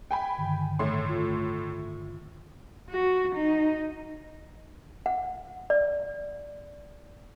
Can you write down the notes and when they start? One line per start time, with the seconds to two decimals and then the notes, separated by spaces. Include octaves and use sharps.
0.11 G5 G#5 B5
0.37 G2 D3 D#3
0.79 A2 C#5 C6
1.09 F4
2.90 F#4
3.35 D#4
5.06 F#5
5.70 D5